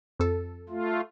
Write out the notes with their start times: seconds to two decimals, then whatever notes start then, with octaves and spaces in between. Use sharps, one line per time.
0.20 F2 A4
0.69 A3 F4